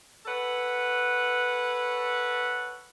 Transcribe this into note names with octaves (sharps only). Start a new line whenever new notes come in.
A4 B4 C#5 F#5